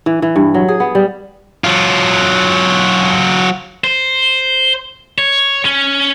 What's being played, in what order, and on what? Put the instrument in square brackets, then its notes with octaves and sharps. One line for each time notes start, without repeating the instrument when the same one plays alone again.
[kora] E3
E3
G2
F#3
G#4
B3
G3
[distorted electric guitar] F#3 F4
C5
C#5
C#4